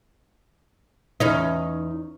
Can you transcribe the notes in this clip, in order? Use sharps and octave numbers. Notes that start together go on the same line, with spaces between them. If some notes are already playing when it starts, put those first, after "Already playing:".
E2 C#4 D#4